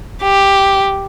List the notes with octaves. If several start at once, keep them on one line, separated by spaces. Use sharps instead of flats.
G4